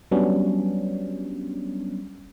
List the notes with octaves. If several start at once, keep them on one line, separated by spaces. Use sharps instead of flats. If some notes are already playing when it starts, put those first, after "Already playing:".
F#3 G3 B3 C#4 D4